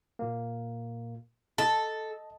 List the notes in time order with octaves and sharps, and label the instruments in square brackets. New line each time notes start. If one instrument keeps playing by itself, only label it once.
[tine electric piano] A#2 A#3
[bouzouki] A4 [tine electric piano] D#5 A5